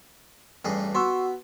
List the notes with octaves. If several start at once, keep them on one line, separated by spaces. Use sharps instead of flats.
A1 G2 G#4
B3 F#4 C6 C#6 E6